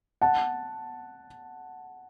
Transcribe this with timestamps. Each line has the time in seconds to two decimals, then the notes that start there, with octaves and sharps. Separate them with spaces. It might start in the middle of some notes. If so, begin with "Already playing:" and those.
0.22 F#5 A5